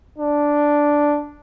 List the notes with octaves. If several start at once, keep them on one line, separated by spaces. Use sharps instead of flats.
D4